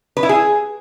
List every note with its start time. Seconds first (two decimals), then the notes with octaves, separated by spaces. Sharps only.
0.17 B4
0.23 E4
0.29 G#4